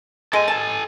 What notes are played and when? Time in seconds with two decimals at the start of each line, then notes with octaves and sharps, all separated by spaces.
0.33 G#3 A4 G#5
0.48 A5